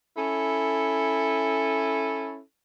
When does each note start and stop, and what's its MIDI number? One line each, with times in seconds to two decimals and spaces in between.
0.17 2.40 61
0.17 2.40 64
0.17 2.40 69